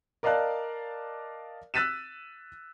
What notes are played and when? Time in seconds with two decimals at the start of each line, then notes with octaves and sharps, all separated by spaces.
0.23 A#4 D5 D#5 F5 A5 F#6
1.74 E6 F#6 A6 B6 D#7 E7